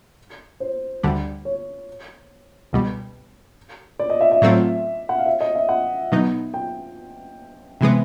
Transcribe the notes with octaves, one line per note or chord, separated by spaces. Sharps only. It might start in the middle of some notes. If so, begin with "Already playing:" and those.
C5
D2 D3 G3
C#5
C#2 B2 G3
D5
D#5
E5
E5
A2 F#3 A3 C4 F4
F#5
F5
E5
D#5
E5
F#5
B2 F#3 B3 D#4
G5
C3 E3 G#3 B3